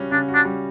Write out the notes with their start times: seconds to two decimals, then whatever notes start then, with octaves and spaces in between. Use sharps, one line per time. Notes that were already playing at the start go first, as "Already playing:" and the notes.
Already playing: C#3 G3 C#4 F#4
0.11 C#3 D4
0.28 F#4
0.34 D4
0.45 G3